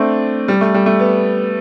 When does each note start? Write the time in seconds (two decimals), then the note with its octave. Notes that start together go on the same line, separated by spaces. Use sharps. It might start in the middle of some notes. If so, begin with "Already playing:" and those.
Already playing: A3 C4 D4
0.48 G3
0.61 A3
0.74 G3
0.86 A3
1.00 B3